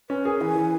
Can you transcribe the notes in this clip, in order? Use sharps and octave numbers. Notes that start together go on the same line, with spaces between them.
C#4 B4
G#4 A#4
E3 G#5
E3